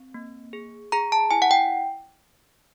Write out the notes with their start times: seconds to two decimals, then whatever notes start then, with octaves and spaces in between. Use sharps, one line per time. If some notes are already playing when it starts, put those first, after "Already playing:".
Already playing: C4
0.14 A#3
0.53 G#4
0.92 G#4 A#5
1.12 A5
1.31 E4 G#5
1.42 F#5
1.51 G5